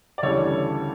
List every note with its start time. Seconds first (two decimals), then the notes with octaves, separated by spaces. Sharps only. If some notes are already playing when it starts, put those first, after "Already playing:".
0.18 D5
0.23 D2 C#3 E3 G3 A4 C#5